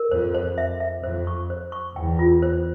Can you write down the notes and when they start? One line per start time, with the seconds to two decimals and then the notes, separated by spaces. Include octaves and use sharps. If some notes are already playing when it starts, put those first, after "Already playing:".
Already playing: A#4
0.11 F2 C5
0.35 C5
0.58 E5
0.80 E5
1.03 F2 C5
1.27 C#6
1.50 C5
1.72 C#6
1.96 E2 G5
2.19 F4
2.42 C5